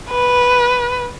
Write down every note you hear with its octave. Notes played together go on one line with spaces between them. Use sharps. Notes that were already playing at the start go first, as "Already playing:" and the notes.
B4